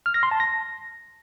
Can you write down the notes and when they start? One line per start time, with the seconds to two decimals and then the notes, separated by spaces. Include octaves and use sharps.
0.06 F6
0.14 A#6
0.23 C6
0.31 A5
0.40 A#6